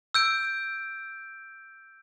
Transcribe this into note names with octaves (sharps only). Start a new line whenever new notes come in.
E6 G6 D7